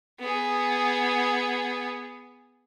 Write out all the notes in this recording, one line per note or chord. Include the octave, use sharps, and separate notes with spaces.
B3 G#4